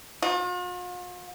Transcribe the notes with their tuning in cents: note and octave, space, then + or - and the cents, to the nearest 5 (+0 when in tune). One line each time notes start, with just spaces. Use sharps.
F4 +45